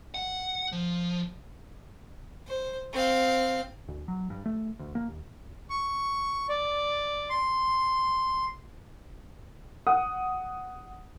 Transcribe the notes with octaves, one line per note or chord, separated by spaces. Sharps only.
F#5
F3
C5
C4 F5
D2
F#3
G2
A3
D2
A#3
D#2
C#6
D5
C6
F#5 D#6